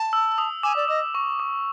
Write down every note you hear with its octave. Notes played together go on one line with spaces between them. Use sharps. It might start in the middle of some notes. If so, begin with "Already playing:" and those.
Already playing: A5
E6
D#6
G#5 D6
D5
D#5 D6
C#6
D6